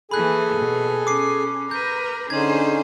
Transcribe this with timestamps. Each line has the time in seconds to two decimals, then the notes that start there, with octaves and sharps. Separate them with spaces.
0.11 E3 A#3 G#4 A4 G#5 B5 F#6
0.58 B2
1.07 C#4 D6 C7
1.71 A#4 B4 G6
2.30 D3 C#4 D#4 G#4 C5 G#6